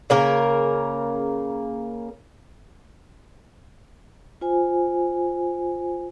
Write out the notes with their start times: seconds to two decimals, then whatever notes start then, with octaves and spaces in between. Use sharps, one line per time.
0.10 C#3 A#3 A#4
4.41 F4 C5 G#5